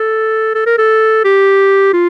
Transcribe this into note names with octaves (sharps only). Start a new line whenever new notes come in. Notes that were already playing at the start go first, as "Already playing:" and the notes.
Already playing: A4
A4
A#4
A4
G4
F4